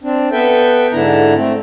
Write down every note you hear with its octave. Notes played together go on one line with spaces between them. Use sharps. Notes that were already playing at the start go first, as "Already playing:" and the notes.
C4 D4
B3 A4 B4 E5 G5
G#2 D3 D4 E4 A#5
A3 C4